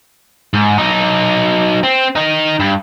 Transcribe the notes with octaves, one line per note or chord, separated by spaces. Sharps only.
G#2
F#3 D#4
C4
D#3 D#4
G2